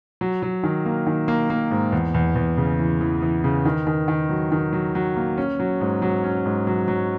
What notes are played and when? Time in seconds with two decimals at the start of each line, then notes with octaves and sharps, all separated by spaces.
0.21 F#3
0.43 F#3
0.63 D#3
0.86 A#3
1.07 D#3
1.28 A#3
1.50 A#3
1.71 G#2
1.92 E2
2.14 E2
2.35 E2
2.57 C#3
2.79 E3
3.01 E3
3.22 E3
3.44 C#3
3.65 D#3
3.87 D#3
4.08 D#3
4.30 F#3
4.52 D#3
4.73 F#3
4.95 F#3
5.17 A#3
5.38 C#4
5.60 F#3
5.81 G#2
6.02 F#3
6.24 C#4
6.46 G#2
6.67 F#3
6.88 F#3